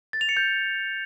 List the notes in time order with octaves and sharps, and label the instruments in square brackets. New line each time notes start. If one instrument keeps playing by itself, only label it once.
[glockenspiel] A6
F7
C#7
G6